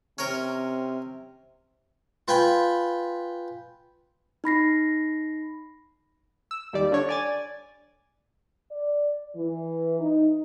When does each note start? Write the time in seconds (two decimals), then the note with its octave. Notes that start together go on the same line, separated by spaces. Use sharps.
0.18 C3 C#4 A#4
2.28 F4 B4 G5 G#5 B5 C6
4.44 D#4 B5 A#6 C7
6.51 E6
6.73 D#2 G3 D5
6.92 D3 C#5
7.09 D5 G#5 A6
8.72 D5
9.35 E3
9.99 D#4